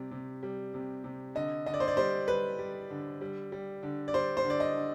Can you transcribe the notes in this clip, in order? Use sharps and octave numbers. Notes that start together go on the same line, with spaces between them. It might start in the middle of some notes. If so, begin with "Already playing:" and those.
Already playing: C3 G3
C3
G3
C3
C3
D3 D#5
D3 D#5
D5
C5
D5
G3 C5
G3 B4
G3
D3
G3
G3
D3
D5
G3 C5
C5
D3
D5
D#5
D3